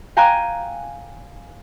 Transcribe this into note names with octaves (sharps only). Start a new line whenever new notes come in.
F5 G5 G#5 A#5 F#6